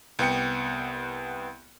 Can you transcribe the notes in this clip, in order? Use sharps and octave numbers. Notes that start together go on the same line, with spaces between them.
C2 B3 G5 C#7